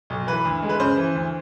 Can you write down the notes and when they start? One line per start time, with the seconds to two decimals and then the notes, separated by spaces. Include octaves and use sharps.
0.10 B1
0.27 E3 B4
0.45 D2
0.63 G#3
0.69 B4
0.79 C#3 C5
0.97 E3
1.15 D2